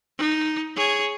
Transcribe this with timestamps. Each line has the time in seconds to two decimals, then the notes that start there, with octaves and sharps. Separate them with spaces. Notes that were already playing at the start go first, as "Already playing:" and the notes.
0.18 D#4
0.76 G#4 C#5